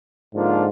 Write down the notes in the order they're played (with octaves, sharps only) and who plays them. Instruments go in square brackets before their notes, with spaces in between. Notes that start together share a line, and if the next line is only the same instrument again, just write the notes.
[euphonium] G#2 [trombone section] D3 F3 A#3 D4 F4